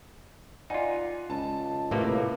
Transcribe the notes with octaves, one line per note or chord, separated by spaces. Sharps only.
D#4 F4 D5 F#5 G#5
C#2 A5
A2 C3 A3 A#3 B4 D6